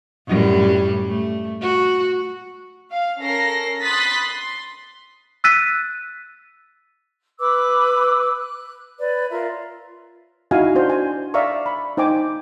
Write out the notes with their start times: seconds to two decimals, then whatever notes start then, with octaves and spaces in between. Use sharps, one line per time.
0.28 F#2 A2 G3
1.08 A3
1.61 F#4
2.92 F5
3.21 C#4 A4 A#4 A#6 C7
3.82 B5 C6 D#6 F#6 A6 B6
4.22 C6
5.44 E6 F#6 A6 B6 D#7
7.40 B4 D6 E6
8.37 F#6
8.99 B4 C#5 D5
9.30 F4 A#4 E5
10.51 D#4 E4 F#4 D#5 F5 G#5
10.75 D4 F#4 C5
10.90 G#5
11.34 D5 E5 F5 A#5 C#6
11.66 B5
11.97 D#4 C5 G5 G#5 D6